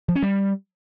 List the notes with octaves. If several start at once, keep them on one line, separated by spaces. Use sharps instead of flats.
F3
C#4
G3